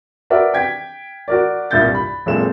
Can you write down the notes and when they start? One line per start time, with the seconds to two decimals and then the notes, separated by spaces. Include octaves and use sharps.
0.30 F#4 A#4 B4 D5 E5 F#5
0.54 G5 G#6 B6
1.28 F#4 A#4 D5
1.71 C2 G2 A#2 E5 G6 A6
1.95 B5
2.26 F#1 A#2 G#3 C4 A4 E7